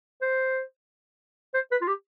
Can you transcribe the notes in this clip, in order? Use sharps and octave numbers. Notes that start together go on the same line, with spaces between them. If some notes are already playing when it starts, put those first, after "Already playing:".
C5
C5
B4
F4
G4